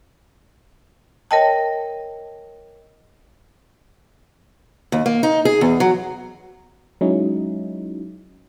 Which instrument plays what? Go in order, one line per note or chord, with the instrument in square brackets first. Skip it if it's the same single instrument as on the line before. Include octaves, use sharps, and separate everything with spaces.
[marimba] A#4 C#5 D#5 G5 A5
[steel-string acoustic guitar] D#2
A#3
D#4
G#4
E2
F#3
[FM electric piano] F#3 G#3 C#4 D#4 E4